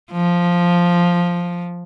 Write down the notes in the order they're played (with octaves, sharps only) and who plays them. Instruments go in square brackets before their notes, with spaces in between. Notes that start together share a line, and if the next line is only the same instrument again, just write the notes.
[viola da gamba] F3